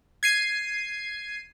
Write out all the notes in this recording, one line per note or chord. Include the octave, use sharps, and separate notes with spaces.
G#6 C7 D#7